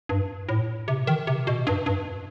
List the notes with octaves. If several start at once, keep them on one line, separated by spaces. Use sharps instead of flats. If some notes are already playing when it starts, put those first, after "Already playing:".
G2
A2
C3
D#3
C3
B2
G2
G2